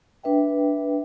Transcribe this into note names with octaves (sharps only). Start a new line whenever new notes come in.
D4 B4 E5 G5